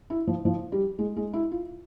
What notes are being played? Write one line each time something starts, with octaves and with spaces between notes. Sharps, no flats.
E4
F3
F3
G3
G#3
G#3
E4
F4